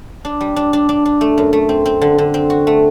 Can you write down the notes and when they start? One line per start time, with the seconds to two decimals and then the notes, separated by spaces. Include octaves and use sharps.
0.25 D4
0.41 G3
0.56 D4
0.73 D4
0.89 D4
1.05 D4
1.21 A3
1.38 F#2
1.53 A3
1.69 C4
1.86 C4
2.01 D3
2.18 D3
2.34 C4
2.50 F#4
2.67 A3